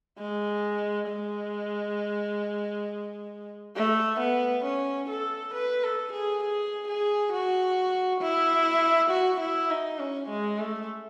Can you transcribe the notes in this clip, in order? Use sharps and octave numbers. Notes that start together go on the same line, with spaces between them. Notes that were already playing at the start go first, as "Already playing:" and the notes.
G#3
G#3
A3
B3
C#4
A4
B4
A4
G#4
G#4
G#4
F#4
E4
F#4
E4
D#4
C#4
G#3
A3